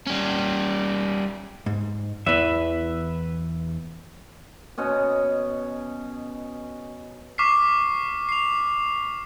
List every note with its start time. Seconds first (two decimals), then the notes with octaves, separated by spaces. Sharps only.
0.07 G3 C#4
1.66 G#2
2.26 E2 E3 B4 E5
4.78 B2 C#4 D#5
7.38 C#6 D6 F6 B6 C7
8.29 C7 F7